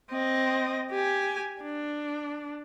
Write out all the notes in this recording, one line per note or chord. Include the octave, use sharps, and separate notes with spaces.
C4 D#5
G4 G#5
D4